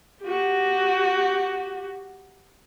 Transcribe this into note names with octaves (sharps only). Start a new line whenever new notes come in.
F#4 G4